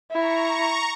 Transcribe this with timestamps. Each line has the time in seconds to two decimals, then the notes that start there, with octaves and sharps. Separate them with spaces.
0.12 E4 A#5 C#6